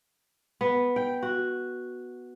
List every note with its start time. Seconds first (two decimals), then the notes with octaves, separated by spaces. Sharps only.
0.61 B3
0.96 G5
1.22 F#4